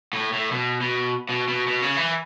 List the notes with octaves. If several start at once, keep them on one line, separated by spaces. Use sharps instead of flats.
A2
A2
B2
B2
B2
B2
B2
C#3
E3